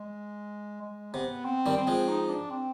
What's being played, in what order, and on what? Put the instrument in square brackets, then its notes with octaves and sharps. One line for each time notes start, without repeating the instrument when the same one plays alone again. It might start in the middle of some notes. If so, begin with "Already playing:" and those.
Already playing: [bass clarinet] G#3
G#3
[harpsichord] C3 [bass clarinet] B3
[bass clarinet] C4
[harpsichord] D#3 G3
[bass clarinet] C4
[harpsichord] F3 G#3
[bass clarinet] D#4
D4
C4